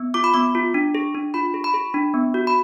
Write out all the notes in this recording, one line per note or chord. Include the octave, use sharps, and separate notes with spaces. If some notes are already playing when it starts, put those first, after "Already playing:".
Already playing: B3
F4 D6
B5
B3 D6
F4
D4
G#4
D4
F4 B5
G#4
B5
G#4
D4
B3
F#4
B5